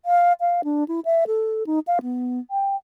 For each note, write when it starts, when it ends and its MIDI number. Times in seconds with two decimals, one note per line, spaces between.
0.05 0.33 77
0.40 0.61 77
0.64 0.84 62
0.88 1.00 64
1.05 1.24 76
1.27 1.63 69
1.66 1.79 63
1.87 2.00 77
2.02 2.40 59
2.51 2.76 79